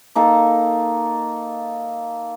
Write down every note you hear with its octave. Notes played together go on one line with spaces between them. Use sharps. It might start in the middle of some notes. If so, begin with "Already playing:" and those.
A#3 D#4 A4